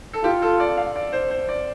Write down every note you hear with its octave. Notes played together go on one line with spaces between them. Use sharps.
A4
F4 G4
A4
D5
F5
D5
C5
C5
D5